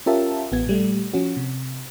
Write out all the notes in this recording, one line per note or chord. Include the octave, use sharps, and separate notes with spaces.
C#4 F4 G4 A#4 E5 A5
A1 B3 G#6
A#2 G3 A3
F3 C#4 F#4
C3